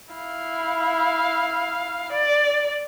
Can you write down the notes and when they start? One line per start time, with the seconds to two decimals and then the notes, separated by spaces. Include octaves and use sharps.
0.13 E4 F5
2.12 D5